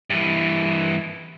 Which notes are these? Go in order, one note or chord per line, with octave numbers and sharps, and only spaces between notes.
G2 E3